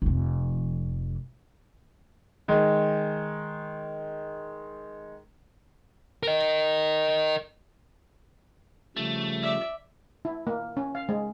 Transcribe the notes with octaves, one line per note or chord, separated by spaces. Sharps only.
F1 F2
D#3 G#3
A#4 D#5
C#3 F3 G3 A3
D5 E5
E4
A#3
C#4
F5
G#3